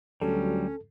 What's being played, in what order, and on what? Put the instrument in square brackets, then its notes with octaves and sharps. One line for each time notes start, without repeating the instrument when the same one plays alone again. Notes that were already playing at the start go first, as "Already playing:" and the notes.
[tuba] D2 [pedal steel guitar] F#3 G3 [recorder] C#4 [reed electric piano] A4